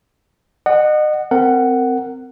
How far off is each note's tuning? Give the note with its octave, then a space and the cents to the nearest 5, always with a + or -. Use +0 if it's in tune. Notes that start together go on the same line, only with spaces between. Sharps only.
D#5 -35 F#5 +0
C4 -15 A#4 -20 F#5 +5